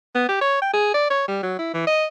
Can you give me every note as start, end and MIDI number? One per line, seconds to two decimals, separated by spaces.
0.15 0.25 59
0.28 0.37 67
0.41 0.59 73
0.62 0.70 79
0.73 0.92 68
0.94 1.09 74
1.10 1.25 73
1.28 1.38 55
1.43 1.54 54
1.59 1.72 64
1.74 1.85 52
1.87 2.05 75